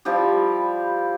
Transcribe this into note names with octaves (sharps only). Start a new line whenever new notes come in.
F3 G3 E4 G4